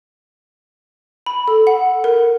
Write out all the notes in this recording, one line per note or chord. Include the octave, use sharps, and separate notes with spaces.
B5
A4
F#5
A#4